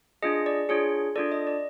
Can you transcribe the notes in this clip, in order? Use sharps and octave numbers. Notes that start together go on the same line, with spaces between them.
D4 F4 G#4 D#5
D5
D4 F4 G#4 C#5
D4 F4 A4 D5
D#5
D5